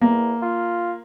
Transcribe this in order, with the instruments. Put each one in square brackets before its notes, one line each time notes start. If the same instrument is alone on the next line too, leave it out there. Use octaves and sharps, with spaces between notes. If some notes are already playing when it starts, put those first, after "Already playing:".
[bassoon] E2 [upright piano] A#3
[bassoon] F4